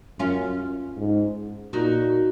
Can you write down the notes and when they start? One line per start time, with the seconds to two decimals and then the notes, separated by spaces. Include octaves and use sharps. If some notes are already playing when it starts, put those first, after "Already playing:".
0.19 F#2 C#4 F4
0.97 G#2
1.73 A#2 D#4 F#4